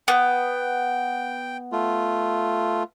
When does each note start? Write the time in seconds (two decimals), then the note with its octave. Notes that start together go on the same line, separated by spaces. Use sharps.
0.08 B3 G5
1.72 A3 F4